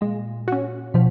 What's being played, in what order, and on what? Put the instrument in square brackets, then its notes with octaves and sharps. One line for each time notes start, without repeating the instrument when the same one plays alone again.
[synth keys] A#2 [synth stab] G#3
[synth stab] C#4 F#4
[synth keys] B2 [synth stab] F3